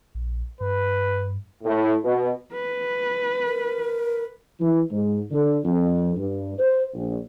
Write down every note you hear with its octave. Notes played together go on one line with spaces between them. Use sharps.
A#1
G2 B4
A2
B2
B4
A#4
E3
G#2
D3
F2
G2
C5
A#1